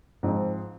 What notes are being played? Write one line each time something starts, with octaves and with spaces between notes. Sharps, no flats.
G#2 F3 C4